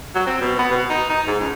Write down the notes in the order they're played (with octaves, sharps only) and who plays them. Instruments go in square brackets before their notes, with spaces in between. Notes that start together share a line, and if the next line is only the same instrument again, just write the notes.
[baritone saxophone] F#3
C4
B2
B3
B2
D#4
D#4
G#2
C#2